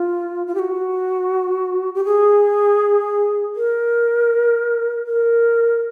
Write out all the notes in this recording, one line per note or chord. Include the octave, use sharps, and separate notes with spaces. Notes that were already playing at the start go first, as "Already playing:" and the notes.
Already playing: F4
F4
G4
F#4
G4
G#4
A#4
A#4